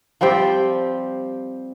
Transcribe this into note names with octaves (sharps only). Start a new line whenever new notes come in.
F3 G3 C4 G4